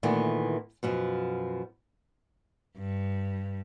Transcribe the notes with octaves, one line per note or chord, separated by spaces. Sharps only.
A#2 D#3 E3 A3 B3
F#2 B2 F3
G2